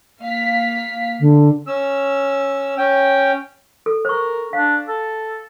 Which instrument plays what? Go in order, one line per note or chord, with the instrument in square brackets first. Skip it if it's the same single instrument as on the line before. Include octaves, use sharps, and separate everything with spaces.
[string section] A#3 F5 B6
[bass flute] D3
[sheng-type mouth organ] C#4 E6
C#4 G5
[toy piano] A4
[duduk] A#4 [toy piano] C5 C#6
[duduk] D4 [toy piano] F5
[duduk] A4